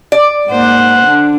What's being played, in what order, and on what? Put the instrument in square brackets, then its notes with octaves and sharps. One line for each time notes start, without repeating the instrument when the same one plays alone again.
[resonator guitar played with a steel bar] D5
[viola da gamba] G#2 A#3 C5 [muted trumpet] F#5
[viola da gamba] D3 D4